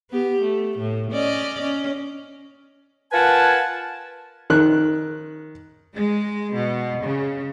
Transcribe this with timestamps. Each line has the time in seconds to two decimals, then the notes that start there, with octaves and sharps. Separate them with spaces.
0.10 B3 G4
0.41 A3
0.78 A2
1.11 C#4 D5 D#5
1.62 C#4
3.13 F4 A#4 B4 F#5 G#5 A5
4.50 D#3 F#6
5.94 G#3
6.55 B2
7.04 C#3